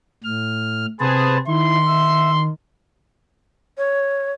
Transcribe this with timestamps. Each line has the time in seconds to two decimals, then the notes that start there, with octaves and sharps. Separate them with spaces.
0.24 A2 F6
1.00 C3 B3 G#4 B4 C5 A5
1.47 D#3 E4 C6
1.87 E5
3.77 C#5